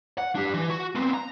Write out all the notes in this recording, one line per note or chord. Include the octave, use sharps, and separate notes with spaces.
F#5
D4 G4
E3
F#4
B3 C4
A#5